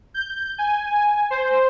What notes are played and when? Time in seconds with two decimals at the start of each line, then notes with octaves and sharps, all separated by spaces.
0.14 G6
0.58 G#5
1.31 C5